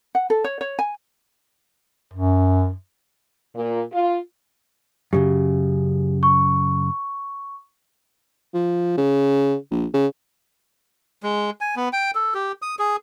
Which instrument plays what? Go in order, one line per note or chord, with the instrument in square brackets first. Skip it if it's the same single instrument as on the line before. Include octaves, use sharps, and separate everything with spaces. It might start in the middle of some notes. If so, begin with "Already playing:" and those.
[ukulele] F#5
A4
C#5
C#5
G#5
[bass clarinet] F#2
[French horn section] A#2
F4
[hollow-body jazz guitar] F#2 A2 C#3 [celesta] G4
[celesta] C#6
[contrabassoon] F3
C#3
A#1
C#3
[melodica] G#3
G#5
B3
G5
A4
G4
D#6
G#4